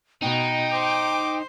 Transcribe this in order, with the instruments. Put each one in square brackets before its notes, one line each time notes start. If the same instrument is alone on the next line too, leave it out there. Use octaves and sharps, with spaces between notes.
[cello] B2 [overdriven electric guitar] D#4 [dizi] G5
[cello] C5 [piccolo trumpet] D6